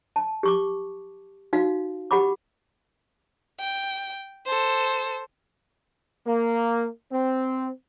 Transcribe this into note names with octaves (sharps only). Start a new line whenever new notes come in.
A5
G4 C#6 D6
D#4 F#4 F5
G4 F#5 B5 D6
G5
A4 C5
A#3
C4